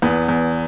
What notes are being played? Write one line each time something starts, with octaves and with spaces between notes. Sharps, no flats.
E2 B3
E2